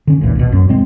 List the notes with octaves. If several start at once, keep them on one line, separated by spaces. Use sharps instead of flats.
D3 C#4
G#1 D#2 A#2 E3
A#1 B2
F#2
D#1 B2 G#3 C4